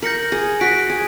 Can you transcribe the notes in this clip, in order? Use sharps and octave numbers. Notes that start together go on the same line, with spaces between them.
A#4 G6 A#6 C#7 F#7
G#4
F#4 F#6 B6 D7
G#4